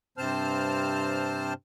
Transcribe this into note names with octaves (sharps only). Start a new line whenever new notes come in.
G2 C3 C4 C5 A5 F6